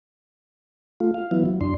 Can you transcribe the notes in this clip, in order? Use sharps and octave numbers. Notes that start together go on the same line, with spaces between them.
A3 F4
F5
E3 F#3 B3 E4
F#3
F#2 D4 C6